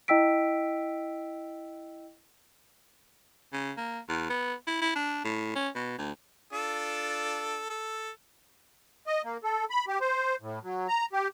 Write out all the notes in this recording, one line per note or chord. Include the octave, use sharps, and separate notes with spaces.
E4 D#5 G5 E6 B6 D7
C#3
A#3
E2
B3
E4
E4
D4
A2
C#4
B2
D2
D4 F4 A4
A4
D#5
A#3
A4
B5
G4
C5
A2
F#3
A#5
G4